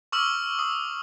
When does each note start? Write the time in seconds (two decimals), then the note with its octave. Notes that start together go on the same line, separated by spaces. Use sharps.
0.12 C#6 D6 E6 F6 F#7
0.59 D#6